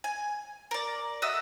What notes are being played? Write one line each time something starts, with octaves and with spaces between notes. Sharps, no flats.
G#5
A#4 D5
F#4 A4 D#5 E5